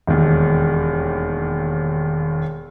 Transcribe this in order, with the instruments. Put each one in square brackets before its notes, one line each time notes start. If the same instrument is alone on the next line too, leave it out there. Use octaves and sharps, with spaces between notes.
[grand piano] E1 D#2